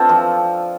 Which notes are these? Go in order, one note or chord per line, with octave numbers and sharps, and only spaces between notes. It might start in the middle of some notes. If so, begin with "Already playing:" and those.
Already playing: C4 D4 F4 A4
F3